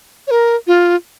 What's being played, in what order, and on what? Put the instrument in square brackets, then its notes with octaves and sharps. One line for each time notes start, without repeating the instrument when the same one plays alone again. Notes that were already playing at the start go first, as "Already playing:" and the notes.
[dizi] C#5
A#4
F4